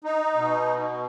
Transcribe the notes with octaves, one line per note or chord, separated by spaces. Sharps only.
D#4
B2